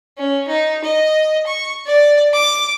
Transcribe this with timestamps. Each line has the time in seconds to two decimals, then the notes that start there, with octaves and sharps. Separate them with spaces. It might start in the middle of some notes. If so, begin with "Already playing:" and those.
0.18 C#4
0.48 D#4
0.84 D#5
1.47 C#6
1.86 D5
2.34 D6